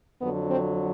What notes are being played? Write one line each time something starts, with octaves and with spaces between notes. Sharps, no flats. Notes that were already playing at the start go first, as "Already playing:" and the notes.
F2 D3 F#3 B3
C4